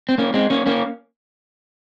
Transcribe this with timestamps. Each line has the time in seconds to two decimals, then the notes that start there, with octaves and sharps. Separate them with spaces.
0.09 C4
0.18 A#3 C#4
0.34 G#3 C4
0.50 A#3 C#4
0.66 A#3 C#4